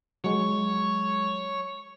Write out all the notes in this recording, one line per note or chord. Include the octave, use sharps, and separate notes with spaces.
F#3 G#3 C#5